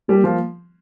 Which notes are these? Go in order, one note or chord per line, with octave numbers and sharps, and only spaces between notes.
G3 A#3
F3